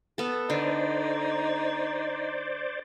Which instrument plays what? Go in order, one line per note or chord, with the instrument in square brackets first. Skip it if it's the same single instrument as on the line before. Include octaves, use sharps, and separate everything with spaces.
[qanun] B3 A4
[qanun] D3 [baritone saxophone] D#4 [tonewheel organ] C5 D5